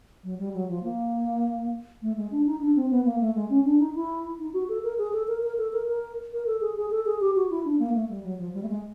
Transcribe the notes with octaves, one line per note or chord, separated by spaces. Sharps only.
F#3
G3
F#3
F3
A#3
A3
G#3
D4
D#4
D4
C4
B3
A#3
A3
G#3
C#4
D4
D#4
E4
D#4
F#4
A4
A#4
G#4
A4
A#4
A#4
A4
A#4
A#4
A#4
A4
G#4
G#4
A4
G#4
G4
F#4
E4
D4
A#3
A3
G3
F#3
F3
G3
A3
G#3